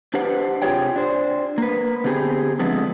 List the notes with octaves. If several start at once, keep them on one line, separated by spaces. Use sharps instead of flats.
D4 G4 B4 C5 F#5
C3 F4 G4 G#4 C#5 G5
D4 C5
A#3 B4
D3 B3 C4 G4 G#4
D3 F3 G#3 A3 B3 C4